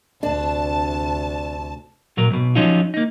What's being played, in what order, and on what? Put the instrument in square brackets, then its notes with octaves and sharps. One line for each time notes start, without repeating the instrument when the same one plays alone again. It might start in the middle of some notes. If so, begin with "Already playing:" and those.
[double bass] D2 C3 [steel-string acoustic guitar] D4 [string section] A5
[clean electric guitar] A#2 F#3 A#4
B1 B2
F3 F#3 C#4 D#4 F4
A#3 D#4